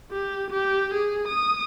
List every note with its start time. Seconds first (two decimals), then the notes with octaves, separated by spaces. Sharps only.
0.11 G4
0.51 G4
0.94 G#4
1.28 D#6